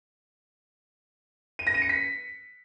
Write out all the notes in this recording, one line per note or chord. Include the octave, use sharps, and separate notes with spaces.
D#7
A#6
D#7
C#7
B6